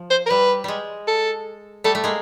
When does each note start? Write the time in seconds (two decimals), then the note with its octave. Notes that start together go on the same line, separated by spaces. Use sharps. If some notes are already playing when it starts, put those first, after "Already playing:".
Already playing: F3
0.10 C5
0.26 A#4
0.30 G3 B4
0.64 G3 G#3
1.08 A4
1.84 G3 A3 A4
1.95 A3
2.04 G#3 A#3